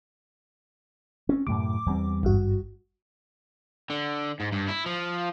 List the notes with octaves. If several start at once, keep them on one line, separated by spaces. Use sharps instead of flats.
C4 C#4
F#2 A2 C3 D6
E2 G3 C4
G#1 G2 F#4
D3
G#2
G2
E4
F3